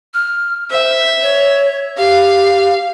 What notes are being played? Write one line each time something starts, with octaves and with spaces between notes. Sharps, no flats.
F6
C5 E5
C#5
G4 F5